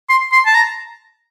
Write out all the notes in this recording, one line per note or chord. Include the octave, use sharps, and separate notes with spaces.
C6
C6
A5
A#5